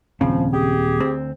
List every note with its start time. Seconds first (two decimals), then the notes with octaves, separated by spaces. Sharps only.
0.21 D#1 C#3 F3 C4
0.53 G4 G#4
1.00 D2 C4